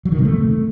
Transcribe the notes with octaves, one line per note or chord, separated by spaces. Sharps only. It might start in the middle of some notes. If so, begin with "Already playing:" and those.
F#3
D#3
C3
A3